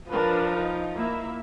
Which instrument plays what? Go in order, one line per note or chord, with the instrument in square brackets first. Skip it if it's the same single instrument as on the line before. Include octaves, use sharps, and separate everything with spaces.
[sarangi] F3 [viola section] D4 A#4 B4
[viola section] D#4
A#3 E4 E5